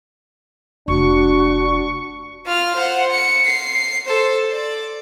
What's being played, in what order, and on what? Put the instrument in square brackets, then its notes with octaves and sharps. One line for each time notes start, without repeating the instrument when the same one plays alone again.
[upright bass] F1 [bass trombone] D4 [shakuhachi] F#4 [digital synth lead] C#6
[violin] F4 F6
C5 F#5
C#7
C7
A4 C5
D5